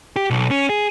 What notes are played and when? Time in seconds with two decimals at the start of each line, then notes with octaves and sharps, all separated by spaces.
0.16 G4
0.30 B1
0.51 C#4
0.69 G#4